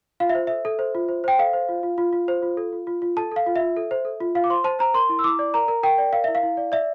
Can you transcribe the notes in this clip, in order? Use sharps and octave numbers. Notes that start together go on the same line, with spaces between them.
F4 F5
E5
C5
A4 E5
A4
C5
F4
C5
C5 G5
A4 F5
C5
F4
F4
F4
F4
C5
F4
A4
F4
F4
F4
A4 A5
A4 F5
F4
E5
F4
A4
C5
A4
F4
F4 F5
D6
C5 C6
C5 A5
C5 A#5
A#4 C6
E4
E6
E4 D6
D5
A#4 A#5
A#4
A#4 G5
D5
A#4 F5
E4 E5
F5
E4
D5
D5 E5